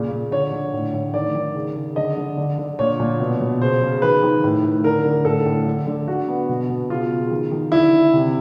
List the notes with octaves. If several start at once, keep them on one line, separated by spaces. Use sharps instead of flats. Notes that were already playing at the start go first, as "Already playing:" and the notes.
Already playing: A#2 C#3
A#2
D3 C#5
D3
A2
A2
D#3 D5
D#3
C#3
C#3
D3 D#5
D3
D3
D3
A#2 C#5
A#2
B2
B2
C#3 C5
C#3
D#3 B4
D#3
A2
A2
D3 A#4
D3
A2 A4
A2
D3
D3
D3 F#4
B3
B2
B2
C#3 F4
C#3
D#3
D#3
D3 E4
D3
C3